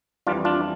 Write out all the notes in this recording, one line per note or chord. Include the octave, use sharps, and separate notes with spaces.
F2 E3 G3 D4 F4
D4 F4